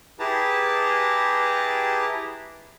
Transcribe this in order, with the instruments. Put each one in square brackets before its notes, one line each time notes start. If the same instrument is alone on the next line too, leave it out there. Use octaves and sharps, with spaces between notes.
[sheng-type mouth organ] E4 G4 G#4 B4 A5 A#5